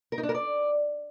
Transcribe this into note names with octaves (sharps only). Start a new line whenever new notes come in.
A#4
D#4
D4
A#4
D5